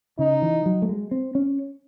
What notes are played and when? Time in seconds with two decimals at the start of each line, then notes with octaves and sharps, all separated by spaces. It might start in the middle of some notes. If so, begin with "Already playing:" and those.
0.19 C#3 D#4
0.42 E3
0.66 F#3
0.82 A3
0.89 G#3
1.11 C4
1.35 C#4